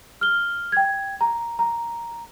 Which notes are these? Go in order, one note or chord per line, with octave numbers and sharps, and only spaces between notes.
F6 G7
G5 G#6
A#5
A#5